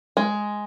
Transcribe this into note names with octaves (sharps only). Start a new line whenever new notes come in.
G#3